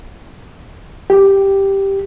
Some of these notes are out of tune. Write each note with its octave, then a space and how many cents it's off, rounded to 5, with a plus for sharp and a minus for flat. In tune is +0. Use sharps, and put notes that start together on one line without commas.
G4 +0